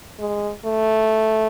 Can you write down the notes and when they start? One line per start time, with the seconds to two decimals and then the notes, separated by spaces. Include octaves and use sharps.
0.20 G#3
0.66 A3